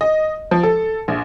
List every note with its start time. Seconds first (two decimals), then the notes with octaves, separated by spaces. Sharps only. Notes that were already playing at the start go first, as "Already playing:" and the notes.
0.01 D#5
0.51 F3
0.63 A4
1.08 A#1